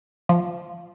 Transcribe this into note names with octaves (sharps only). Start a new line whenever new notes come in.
F3